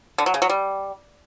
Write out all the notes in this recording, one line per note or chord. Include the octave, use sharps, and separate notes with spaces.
D3
F#3
C#3
F#3
G3